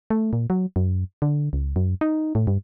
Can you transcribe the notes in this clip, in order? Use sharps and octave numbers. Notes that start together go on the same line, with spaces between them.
A3
A#2
F#3
F#2
D3
C#2
F#2
D#4
A2
G2